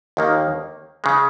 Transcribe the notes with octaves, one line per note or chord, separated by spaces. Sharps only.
D#2 D#3 A#3
C#3 G#3